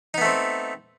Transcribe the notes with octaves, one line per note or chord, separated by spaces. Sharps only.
A3 B3 C4 D#4